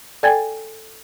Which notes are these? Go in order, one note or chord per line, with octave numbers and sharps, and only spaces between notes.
A4 D5 G5 G#5 G#6 A6